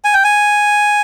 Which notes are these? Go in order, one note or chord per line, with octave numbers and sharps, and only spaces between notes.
G#5
G5
G#5